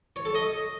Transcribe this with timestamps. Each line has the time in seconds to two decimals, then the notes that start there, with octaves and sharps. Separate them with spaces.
0.16 C#5
0.25 A4
0.35 D#5